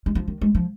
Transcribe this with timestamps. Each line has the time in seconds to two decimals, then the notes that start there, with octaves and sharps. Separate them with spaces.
0.06 G#3
0.15 F3
0.28 D#3
0.41 G#3
0.55 F3